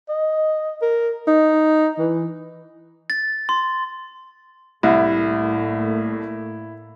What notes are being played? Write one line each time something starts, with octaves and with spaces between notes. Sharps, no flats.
D#5
A#4
D#4
E3
A6
C6
C2 A2 A3 A#3 E4